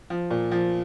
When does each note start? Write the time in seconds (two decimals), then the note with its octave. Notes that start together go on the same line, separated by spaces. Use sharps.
0.10 F3
0.31 A#2
0.52 F3